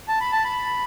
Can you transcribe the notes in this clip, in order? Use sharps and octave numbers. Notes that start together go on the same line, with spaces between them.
A5
B5
A5
B5